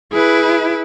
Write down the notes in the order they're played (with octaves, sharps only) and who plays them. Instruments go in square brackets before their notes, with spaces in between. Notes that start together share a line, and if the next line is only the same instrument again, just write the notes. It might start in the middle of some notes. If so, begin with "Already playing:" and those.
[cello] E4 [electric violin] G#4 B4